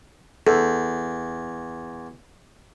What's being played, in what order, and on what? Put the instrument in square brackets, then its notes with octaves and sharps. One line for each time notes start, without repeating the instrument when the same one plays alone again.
[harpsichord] E2 [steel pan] A4